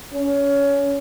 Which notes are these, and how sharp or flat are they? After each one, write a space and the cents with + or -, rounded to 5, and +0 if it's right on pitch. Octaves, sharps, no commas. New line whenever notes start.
C#4 +20